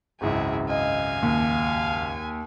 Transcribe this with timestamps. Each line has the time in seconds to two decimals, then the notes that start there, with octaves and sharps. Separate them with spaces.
0.21 G#1 C#2 F#2 E4 G#4
0.70 D#5 F5 G#5
1.23 D#2